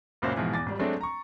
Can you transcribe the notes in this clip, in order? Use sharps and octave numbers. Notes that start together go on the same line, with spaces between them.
F#1 C#2 A#2 F#4 C5 F5
G#2 B2 E3 F3
E2 D6 A6
G#1 G3
F#3 G#3 A3 C4 D4
A#5 C#6